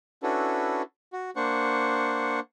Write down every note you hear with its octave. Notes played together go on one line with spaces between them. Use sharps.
C#4 D4 E4 F#4 A4 B4
F#4
A#3 D4 C5 F#5 C#6